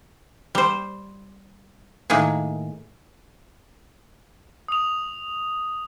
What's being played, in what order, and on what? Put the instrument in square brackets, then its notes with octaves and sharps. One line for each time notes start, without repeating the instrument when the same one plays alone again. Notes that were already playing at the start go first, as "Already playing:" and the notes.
[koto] G3 C5
A2 D#3 A#3 G#4
[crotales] D#6 F7